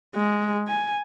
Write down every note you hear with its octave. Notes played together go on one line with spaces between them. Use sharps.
G#3
G#5